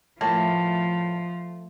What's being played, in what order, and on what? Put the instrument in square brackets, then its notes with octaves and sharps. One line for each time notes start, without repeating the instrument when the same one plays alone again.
[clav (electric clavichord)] A2 A#3 [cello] F3 [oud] A3